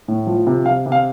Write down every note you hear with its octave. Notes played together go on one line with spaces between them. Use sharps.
A2
F3
C3
C3 F5
C3
F5